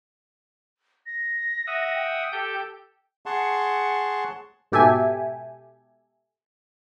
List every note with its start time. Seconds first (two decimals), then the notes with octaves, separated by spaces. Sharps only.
1.06 A#6
1.67 E5 F#5 D#6
1.95 G5
2.32 G4 A4 G6
3.26 G#4 F#5 A5 C6 C#6
4.72 G#2 B2 G4 A4 E5 G#5